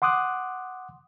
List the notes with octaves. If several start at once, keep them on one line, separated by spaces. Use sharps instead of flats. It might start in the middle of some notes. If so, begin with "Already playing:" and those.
F#5 C6 D6 D#6 F#6